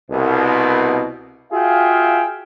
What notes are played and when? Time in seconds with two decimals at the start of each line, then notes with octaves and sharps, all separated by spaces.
0.11 C2 B2
1.52 F4 F#4 G#4 E5 F5 G5